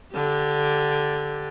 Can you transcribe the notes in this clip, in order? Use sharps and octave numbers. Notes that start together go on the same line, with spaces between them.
D3 G4